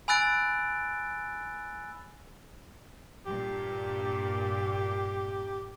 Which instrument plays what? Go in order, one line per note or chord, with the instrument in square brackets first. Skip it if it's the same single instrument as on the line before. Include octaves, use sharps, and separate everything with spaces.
[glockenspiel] G#5 B5 E6 F#6 A6 D7
[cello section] G2 A#2 [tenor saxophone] G4